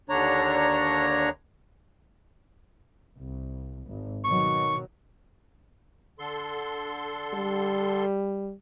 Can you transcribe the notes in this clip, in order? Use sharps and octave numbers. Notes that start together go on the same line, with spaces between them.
D#2 D3 D4 C#5 A#5
C2
G#1
B2 D#3 F#3 C#6
D3 A4 C6
G3